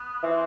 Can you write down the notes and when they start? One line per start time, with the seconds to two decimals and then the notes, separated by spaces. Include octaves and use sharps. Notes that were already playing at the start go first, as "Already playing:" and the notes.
Already playing: B3
0.23 E3 C4